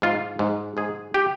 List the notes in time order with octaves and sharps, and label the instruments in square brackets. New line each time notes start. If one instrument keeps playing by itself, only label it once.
[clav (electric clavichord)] G#2 F4
G#2
G#2 G#4
G4